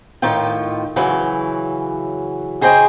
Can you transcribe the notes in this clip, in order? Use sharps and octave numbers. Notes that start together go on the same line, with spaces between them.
A2 D#3 F4 G5
C#3 E3 F#3
C#3 G#4 C5 D#5 F5 G5